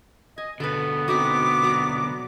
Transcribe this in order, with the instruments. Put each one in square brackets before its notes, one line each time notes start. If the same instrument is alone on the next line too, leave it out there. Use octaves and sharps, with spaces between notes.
[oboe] D#5 [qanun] G#5
[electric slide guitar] B2 D3 [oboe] B3 [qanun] A4 B4
[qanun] C4 D#4 F#4 [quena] D6
[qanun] F#3 D5 A#5